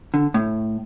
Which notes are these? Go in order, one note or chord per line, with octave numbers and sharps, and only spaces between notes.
D3
A2